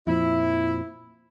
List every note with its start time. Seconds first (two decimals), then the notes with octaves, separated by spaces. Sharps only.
0.07 F2 A#2 F3 E4